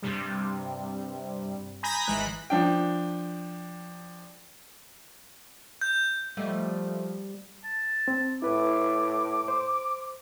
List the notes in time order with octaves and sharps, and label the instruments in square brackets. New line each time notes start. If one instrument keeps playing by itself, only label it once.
[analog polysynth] G2 C3 G3
G#5 A#5 B5 D#6 G6 A#6
G#1 E3 G#3 B5 F#6
[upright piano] F3 D4 G5
[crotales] G6
[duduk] F3 [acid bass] G3 [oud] A3 D#5
[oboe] A5
[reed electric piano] C4
[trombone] A2 [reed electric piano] E4 B4 [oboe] D6
[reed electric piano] C5